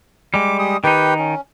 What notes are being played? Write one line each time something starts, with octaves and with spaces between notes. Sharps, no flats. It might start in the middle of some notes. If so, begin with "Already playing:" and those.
G3 G#3 D6
G4 G#4 D#6
D#3 D#4 G4 B4 G5
C#4